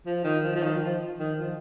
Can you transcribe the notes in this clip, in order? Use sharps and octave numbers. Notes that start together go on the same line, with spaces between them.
F3
D#3
F3
F3
D#3
F3
D#3
F3